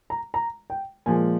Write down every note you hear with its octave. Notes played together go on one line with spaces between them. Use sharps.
A#5
A#5
G5
A#2 F3 G#3 G#5